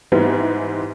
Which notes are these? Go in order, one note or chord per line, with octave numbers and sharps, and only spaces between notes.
G#2 E3 G3 B3 C4